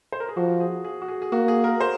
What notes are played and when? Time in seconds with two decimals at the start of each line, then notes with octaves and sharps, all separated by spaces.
0.12 C5
0.20 A#4
0.29 G#4
0.37 F3 F#4
0.60 G#4
0.84 G#4
1.02 F#4
1.08 G#4
1.22 G#4
1.32 A#3 F#4
1.48 G#4
1.64 A#4
1.81 C5